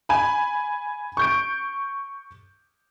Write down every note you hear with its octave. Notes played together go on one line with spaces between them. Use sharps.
G#5 B5
C#6 G6 D7